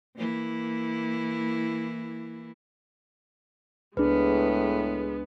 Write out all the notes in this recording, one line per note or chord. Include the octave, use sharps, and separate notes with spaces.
E3 A#3 E4
C#2 A2 G#3 B3 D4 G#4 B4